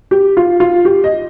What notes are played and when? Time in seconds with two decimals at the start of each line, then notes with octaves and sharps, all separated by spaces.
0.11 G4
0.37 F4
0.60 F4
0.85 G4
1.04 D#5